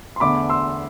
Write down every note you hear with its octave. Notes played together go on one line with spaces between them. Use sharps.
C6
E2 D3 A3 B5 D6
C6 E6